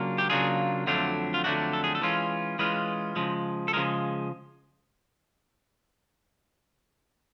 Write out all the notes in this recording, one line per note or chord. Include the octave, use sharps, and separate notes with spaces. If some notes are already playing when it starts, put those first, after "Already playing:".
Already playing: C#3 F#3 A#3 D4 F4
G4
C#3 F#3 A#3 D4 F4 G#4
F2 D3 F#3 A3 D4 F4
F4
F2 D3 F#3 A3 D4 F#4
A4
G#4
A4
E3 G#3 C#4 F4
E3 G#3 C#4 F4 B4
C#3 F3 G#3
A4
C#3 F3 G#3 A#4